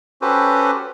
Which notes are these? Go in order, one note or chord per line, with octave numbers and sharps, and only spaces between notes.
C#4 F#4 G4 A4 B4 C5